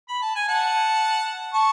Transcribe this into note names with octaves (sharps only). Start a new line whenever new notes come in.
B5
A5
G#5
F#5 A5
A5 C#6